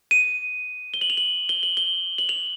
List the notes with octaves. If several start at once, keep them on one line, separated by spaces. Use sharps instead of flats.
D#7
G7
F#7
F7
F#7
G7
F#7
G7
F#7
F7